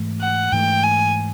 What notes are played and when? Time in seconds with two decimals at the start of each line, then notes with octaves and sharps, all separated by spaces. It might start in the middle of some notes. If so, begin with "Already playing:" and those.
Already playing: G#2 E3 A3
0.21 F#5
0.52 G#2 E3 A3 G5
0.83 G#5